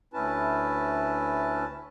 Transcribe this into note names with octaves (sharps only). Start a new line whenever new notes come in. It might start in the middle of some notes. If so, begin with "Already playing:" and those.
D2 C#4 E4 B4 A5